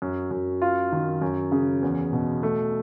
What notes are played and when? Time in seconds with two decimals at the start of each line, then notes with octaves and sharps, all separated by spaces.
0.02 F#2
0.31 F#2
0.62 F4
0.92 D#3
1.22 F#2
1.52 C#3
1.83 E2
2.13 B2
2.43 A3